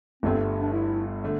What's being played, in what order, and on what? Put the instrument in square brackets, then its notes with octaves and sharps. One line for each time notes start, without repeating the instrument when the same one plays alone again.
[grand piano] G1 G2 D3 A3 [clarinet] C4
[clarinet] D4
E4
[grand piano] D3 A3